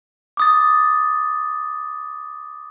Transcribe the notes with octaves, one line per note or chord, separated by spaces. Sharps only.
D6 D#6 A6